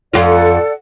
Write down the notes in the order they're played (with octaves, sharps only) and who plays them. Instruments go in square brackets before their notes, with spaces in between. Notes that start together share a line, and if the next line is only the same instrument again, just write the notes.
[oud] F2 F4 [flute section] A4 D5 F#5